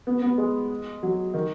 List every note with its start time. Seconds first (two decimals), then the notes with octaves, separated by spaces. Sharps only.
0.07 B3
0.22 B3
0.38 G#3
1.03 F#3
1.34 D#3